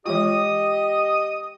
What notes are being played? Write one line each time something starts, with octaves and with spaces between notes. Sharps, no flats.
E3 G#3 F4 G4 D#5 D#6